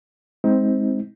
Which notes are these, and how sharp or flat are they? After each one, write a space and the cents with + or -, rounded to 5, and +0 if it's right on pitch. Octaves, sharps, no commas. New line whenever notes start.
G#3 +0 C4 +0 D#4 +30